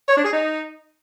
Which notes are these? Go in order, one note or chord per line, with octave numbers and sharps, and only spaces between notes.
C#5
D4
G#4
D#4